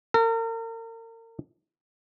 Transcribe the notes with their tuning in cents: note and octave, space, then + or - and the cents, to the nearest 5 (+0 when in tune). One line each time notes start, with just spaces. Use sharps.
A#4 -40